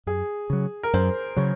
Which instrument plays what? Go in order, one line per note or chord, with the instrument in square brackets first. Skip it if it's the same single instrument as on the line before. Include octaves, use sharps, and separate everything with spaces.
[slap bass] F#2 [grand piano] G#4
[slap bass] C#3 F#3
[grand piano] A#4
[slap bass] F#2 [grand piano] C5
[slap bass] C#3 F#3 [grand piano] C#5